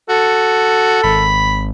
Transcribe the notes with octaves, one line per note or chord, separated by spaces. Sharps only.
F#4 A4
G#1 B5